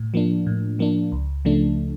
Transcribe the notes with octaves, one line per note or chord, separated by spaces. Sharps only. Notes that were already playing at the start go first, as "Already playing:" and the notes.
Already playing: A2
F3 A#3 D4
A2
F3 A#3 D4
C#2
C#3 F3 A3 D4